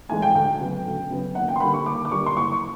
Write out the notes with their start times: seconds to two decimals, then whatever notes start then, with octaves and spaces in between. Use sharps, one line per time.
0.09 A2 E3 G#3 G#5
0.22 G5
0.35 D2 G5
0.60 C#3 F#3 B3
0.86 D2
1.11 C#3 F#3 B3
1.35 D#2 F#5
1.48 G5
1.56 C6
1.60 D3 G3 A#3 B5
1.74 C#6
1.86 D#2 D6
2.05 D6
2.11 D3 G3 A#3 C#6
2.26 C6
2.36 F#1 C#6
2.52 C#6